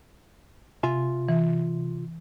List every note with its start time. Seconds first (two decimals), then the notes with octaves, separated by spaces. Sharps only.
0.83 C3 F4 E5 G#5
1.28 E3